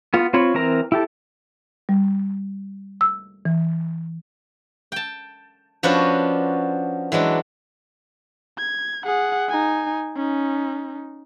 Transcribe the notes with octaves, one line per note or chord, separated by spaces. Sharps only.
B3 F4
C4 F4 C#5 B5
E3 C4 A#4 A#5
E4 G4 A4
G3
E6
E3
G5 A5
F3 B3 C#4 D4 F#4 B4
E3 F#3 G#3 D4
G#6
G#4 F#5
D#4 G#5
C#4 D#4